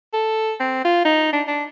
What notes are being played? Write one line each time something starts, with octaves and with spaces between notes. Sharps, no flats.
A4
C4
F4
D#4
D4
D4